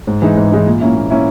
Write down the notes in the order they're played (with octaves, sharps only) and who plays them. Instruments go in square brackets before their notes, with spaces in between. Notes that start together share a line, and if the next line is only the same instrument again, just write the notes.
[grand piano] G#2
E3 G#3 D#4
G#2
E3 G#3 D#4
A#2
A#3 C#4 E4
A#2
A#3 C#4 E4